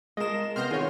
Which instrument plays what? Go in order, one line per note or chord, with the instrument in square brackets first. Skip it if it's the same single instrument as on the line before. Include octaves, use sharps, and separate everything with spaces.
[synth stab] G#3 E7 [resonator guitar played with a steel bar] F4 A#4 [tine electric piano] D#5
[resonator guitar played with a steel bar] C3 F4 [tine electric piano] B3 C6 [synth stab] F6 G6 A#6
[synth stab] D#3 F4 C#5 [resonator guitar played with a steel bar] G#4